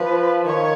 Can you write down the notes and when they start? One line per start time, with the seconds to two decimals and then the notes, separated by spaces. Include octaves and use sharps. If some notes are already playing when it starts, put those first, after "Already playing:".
Already playing: F3 B4
0.45 D#3 C#5